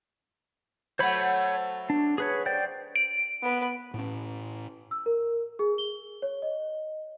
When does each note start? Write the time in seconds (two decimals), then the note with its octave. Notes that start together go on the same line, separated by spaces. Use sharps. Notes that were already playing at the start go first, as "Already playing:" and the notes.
0.99 F#3 A3 C5 C#5 B5
1.90 D4
2.18 G#4 B4 C#5
2.46 C5 D5 G5
2.96 D7
3.42 B3 B4
3.94 A2 C#4
4.91 E6
5.06 A#4
5.59 G#4
5.78 G7
6.22 C#5
6.42 D#5